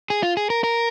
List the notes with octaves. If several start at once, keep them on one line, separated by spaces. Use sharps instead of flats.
G#4
F4
G#4
A#4
A#4